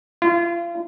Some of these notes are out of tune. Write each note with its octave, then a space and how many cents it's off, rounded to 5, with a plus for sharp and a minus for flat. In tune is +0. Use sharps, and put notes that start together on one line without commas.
F4 -35